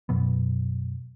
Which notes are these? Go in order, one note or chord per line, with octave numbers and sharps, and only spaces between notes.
F#2 B2 F#3 B3